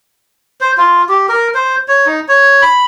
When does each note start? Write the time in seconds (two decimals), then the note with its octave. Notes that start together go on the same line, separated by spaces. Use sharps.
0.61 C5
0.77 F4
1.09 G4
1.29 A#4
1.54 C5
1.88 C#5
2.06 D#4
2.28 C#5
2.62 B5